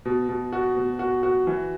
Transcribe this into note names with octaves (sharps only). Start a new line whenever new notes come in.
B2
B2
F#4
B2
F#4
F#4
E3